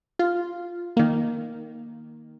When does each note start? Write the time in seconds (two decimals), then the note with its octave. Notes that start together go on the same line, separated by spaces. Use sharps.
0.19 F4
0.97 D#3 A#3